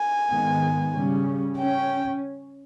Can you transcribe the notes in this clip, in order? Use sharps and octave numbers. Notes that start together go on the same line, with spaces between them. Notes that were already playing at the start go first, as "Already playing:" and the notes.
Already playing: G#5
G#2 D#3 G#3 B3
C#3 G3 C#4
C#4 G5